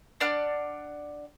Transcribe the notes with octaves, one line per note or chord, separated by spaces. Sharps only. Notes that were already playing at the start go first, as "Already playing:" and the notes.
D4 D5 F#5 F6